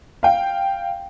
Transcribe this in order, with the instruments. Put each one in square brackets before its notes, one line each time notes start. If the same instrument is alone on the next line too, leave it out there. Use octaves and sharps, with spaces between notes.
[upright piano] F5 G5